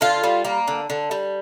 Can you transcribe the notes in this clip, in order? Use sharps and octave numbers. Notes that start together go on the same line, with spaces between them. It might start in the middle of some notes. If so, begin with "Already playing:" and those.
D3 F4
G3
A#3
D3
D3
G3